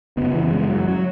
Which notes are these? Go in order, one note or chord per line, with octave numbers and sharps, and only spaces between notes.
F#2 C#3 B3
E3
G#3
F#3
F#3